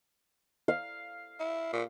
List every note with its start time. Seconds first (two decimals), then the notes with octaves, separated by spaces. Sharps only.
0.68 F5
1.40 E4
1.73 A#2